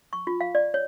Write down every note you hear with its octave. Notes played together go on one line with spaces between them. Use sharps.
C#6
F4
F5
D5
C#5